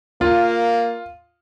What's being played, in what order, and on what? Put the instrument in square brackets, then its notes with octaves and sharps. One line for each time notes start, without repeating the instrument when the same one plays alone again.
[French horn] A#3 [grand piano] F4